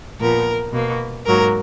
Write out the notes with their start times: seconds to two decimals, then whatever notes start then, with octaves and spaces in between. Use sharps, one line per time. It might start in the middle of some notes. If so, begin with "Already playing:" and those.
0.20 A#2 F3 B3 A#4
0.72 B2 A#3
1.26 G#2 F#3 A#3 A#4